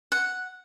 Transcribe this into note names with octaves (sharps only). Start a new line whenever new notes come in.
F#5